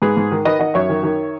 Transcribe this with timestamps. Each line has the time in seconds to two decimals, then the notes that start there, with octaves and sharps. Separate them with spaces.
0.02 G#2 G#4 B4
0.17 G#2
0.32 D#3
0.45 D#3 B4 D#5
0.59 D#3 D#5 F#5
0.74 F#2 C#5 E5
0.89 D#3
1.03 D#3